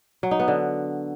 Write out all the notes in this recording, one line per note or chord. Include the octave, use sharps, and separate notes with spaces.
F#3
D#4
B3
D3